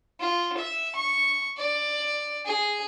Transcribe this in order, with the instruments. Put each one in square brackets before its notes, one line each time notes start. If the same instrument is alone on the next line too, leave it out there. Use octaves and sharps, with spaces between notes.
[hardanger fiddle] F4
E5
C#6
D5
G#4